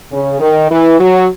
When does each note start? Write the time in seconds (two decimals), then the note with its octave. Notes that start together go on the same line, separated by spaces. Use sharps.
0.11 C#3
0.40 D#3
0.70 E3
0.99 F#3